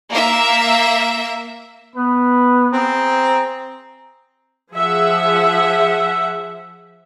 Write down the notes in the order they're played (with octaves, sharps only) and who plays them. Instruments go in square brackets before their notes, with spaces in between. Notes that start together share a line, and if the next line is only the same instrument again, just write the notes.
[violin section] A#3 E5
[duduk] B3 [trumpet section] B4
[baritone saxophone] C4 [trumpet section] G#4 A#5
[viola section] F3 G#4 E5 F#5